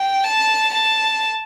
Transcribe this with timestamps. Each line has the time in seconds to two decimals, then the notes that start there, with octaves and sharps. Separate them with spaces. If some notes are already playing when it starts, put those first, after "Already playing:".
Already playing: G5
0.24 A5
0.75 A5